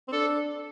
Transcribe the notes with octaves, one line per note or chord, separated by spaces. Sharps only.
C4
D4 A4